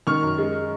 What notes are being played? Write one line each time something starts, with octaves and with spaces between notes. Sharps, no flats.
D#3 C#6 F6
F#2
G#3